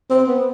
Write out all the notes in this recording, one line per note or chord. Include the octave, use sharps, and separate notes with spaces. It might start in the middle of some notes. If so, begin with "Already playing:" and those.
C4
B3